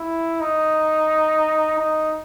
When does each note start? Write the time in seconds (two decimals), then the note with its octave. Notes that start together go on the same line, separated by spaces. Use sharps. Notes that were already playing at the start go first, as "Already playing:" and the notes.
Already playing: E4
0.40 D#4
1.79 D#4